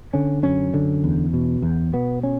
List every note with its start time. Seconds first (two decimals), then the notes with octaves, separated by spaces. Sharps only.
0.14 D3 C#4
0.43 F#2 C#4
0.74 D3
1.04 E2
1.33 B2
1.62 E2
1.93 B2 B3
2.23 C#4